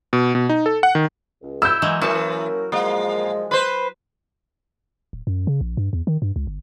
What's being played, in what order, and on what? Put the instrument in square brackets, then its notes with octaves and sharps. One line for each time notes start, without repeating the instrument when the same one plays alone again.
[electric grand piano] B2
B2
D#4
A4
F#5
D#3
[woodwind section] C#2
[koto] E4 [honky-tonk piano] E6 G6
[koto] E3 F#3 G#3 [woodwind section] A#3
[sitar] E3 [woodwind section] A#3 C#4 A#4 [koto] F#4 A5
[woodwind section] A#2 F3 G#3 [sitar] A#3
[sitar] B4 C5
[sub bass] D1
F#2
C#3
A#1
G2
E2
D#3
G2
C#2
G1